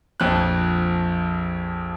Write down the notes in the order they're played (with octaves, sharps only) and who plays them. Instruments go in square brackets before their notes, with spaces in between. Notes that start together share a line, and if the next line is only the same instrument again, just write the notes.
[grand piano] A#1 F2 F#6